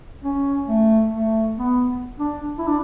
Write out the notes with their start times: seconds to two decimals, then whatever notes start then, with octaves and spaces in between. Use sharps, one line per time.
0.23 C#4
0.68 A3
1.14 A3
1.59 B3
2.19 D4
2.58 E4
2.68 D4